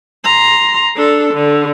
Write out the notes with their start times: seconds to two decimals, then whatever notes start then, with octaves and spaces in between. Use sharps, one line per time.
0.24 A#5 C6
0.96 D4 A4
1.34 D3